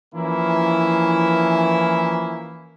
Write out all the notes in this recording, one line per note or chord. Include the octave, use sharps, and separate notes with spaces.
E3 F3 A#3 C#4 E4